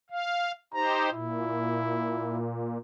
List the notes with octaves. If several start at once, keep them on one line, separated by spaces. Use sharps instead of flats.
F5
D#4 G4 C5 A#5
A#2 E4